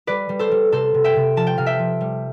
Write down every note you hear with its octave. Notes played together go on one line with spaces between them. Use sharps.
G3 B4 D5
G3
A4 C5
G3
C3 A4 C5
C3
E5 G5
C3
F3 A5
G5
C3 F5
E5 G5
F3
G3